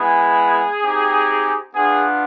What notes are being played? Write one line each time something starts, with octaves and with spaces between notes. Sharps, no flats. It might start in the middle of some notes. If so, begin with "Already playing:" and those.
Already playing: G#3 B3 E4 G#4
C4 D#4 G4
B3 D4 F4 G#4